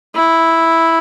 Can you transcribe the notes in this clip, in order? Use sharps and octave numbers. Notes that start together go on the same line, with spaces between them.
E4